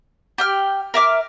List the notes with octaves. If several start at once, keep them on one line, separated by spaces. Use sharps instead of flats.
G4 G5 F6
A#4 E5 D6 F6